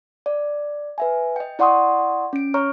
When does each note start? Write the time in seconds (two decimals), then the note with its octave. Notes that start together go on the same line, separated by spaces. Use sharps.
0.26 D5
0.98 B4 E5 G#5
1.36 D#5 G5
1.59 E4 D5 F#5 C6 C#6 D#6
2.33 C#4 D7
2.54 C#5 A#5 C#6 F6